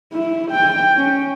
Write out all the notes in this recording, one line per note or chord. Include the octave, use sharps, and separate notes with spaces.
E4
G5
C#4